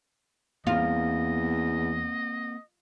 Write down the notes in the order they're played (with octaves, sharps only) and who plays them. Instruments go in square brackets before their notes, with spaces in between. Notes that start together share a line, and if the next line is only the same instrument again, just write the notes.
[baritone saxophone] E2 [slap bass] A#3 C4 [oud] F4 [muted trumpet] D#5